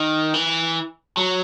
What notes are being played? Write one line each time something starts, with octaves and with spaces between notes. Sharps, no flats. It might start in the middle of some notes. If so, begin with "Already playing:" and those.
Already playing: D#3
E3
F#3